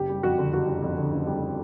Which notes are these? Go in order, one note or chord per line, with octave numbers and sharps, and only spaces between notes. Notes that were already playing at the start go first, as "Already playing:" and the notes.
Already playing: F#1 G4
G3
F2 F#4
D3
F#1 F#4
G3
F2
D3
F#1
G3